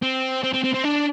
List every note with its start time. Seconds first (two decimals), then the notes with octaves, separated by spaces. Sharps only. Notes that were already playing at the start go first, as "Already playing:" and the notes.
0.02 C4
0.43 C4
0.54 C4
0.64 C4
0.74 C4
0.84 D4